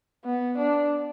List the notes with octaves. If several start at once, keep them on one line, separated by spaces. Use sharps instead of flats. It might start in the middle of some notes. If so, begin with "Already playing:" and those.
B3
D4